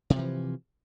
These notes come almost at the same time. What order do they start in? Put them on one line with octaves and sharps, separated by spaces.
C3 G#3 F3 E3